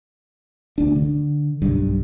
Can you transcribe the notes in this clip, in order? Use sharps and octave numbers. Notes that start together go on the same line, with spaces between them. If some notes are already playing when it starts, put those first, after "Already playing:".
D2 D4
D3
B1 G2